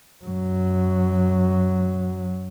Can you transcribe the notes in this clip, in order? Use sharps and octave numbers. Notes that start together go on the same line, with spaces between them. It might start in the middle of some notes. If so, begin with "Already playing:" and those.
F#2 F#3